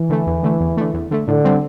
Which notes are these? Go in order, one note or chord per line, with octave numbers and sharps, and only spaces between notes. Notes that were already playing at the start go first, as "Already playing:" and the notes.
Already playing: E3
D3 A3
E2
D3 A3
E2
D3 A3
E2
D3 A3
A2 D3
G3 C4